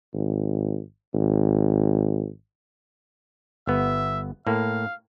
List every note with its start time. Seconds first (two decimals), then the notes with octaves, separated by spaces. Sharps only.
0.14 G#1
1.14 G#1
3.67 G1 B3 E5
4.47 A2 A#3 F5